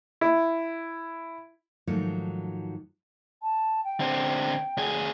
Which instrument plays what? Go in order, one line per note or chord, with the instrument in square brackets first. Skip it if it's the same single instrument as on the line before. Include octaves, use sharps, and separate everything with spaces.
[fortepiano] E4
[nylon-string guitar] G#2 D#3 F3 F#3 A3
[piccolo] A5
G5
[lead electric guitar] D3 C4
D2 G#4